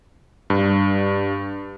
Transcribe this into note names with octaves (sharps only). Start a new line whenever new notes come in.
G2